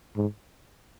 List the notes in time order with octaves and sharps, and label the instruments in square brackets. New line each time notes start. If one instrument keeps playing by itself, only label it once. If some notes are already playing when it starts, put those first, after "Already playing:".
[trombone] G#2